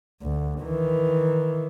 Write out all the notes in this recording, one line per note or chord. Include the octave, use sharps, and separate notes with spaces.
D2
D#3 E3